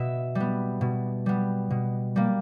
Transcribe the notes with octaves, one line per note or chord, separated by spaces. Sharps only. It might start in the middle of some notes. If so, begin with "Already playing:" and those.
Already playing: B2 E5
G3
B3
B2
G3 B3
B2
G3 A#3